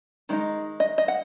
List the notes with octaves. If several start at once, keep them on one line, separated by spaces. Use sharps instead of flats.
D#3 G#3 D#4
D#5
D#5
F#5